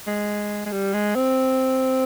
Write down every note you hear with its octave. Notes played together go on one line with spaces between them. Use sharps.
G#3
G#3
G3
G#3
C4